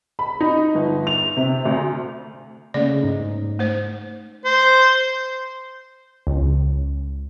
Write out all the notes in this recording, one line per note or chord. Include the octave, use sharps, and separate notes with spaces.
B5
D#4
G1
F7
C3
D2
C#3 A3 A#3 C#4 D5
G#2 D#4
A3 C5
C5
C#2